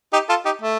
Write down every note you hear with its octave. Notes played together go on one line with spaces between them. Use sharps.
D#4 G4
F4 A4
D#4 G4
A3